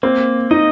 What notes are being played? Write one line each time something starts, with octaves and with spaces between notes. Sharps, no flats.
A#3 C4
D#4 D#5